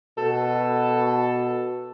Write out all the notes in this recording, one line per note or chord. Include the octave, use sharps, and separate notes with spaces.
B2 A4